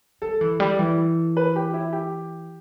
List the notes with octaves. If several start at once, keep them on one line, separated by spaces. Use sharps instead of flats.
G3 A4
E3
G3
E3
B4
G4
E4
G4